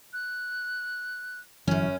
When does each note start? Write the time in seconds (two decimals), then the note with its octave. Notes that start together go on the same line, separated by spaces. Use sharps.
0.13 F#6
1.67 G1 F#2 E3 F#3 C#4